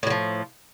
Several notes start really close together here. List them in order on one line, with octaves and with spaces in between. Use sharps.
A2 F#3 F3